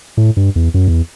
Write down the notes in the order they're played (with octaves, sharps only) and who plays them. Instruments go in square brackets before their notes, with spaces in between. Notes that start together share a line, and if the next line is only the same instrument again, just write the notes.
[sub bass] A2
G2
E2
F#2
E2